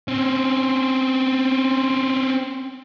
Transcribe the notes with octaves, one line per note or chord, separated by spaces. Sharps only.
C4 C#4